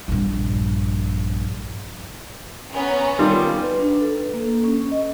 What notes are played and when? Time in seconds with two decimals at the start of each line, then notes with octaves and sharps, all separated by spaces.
0.08 A#1 G2
2.73 B3 C#4 A#5
3.19 D#3 G3 F4
3.63 B4
3.80 D4
4.01 A4
4.33 A#3
4.64 C#4
4.91 D#5